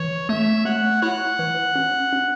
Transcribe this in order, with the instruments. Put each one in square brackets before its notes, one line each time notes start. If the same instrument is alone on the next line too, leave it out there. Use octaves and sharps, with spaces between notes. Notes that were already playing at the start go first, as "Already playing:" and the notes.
Already playing: [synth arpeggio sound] E3 [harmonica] C#5
[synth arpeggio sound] A3 [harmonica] E5
[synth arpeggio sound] A3 [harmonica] C#5 F#5
[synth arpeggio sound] E4 [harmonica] C#5 F#5
[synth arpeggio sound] E3
C#4
C#4